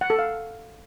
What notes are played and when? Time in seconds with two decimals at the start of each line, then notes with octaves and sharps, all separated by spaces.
0.01 F#5
0.10 A4
0.19 F5